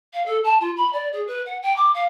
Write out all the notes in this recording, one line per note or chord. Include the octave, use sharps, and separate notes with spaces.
F5
A4
A5
F4
B5
D5
G#4
B4
F#5
G5
D6
F5